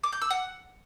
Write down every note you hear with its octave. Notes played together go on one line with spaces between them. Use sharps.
D6
G6
E6
F#5